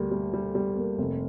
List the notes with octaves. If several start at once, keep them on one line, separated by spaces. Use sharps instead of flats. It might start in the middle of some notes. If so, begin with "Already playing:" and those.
Already playing: D2 G3 A#3
G3
G3
G3
A#3
F1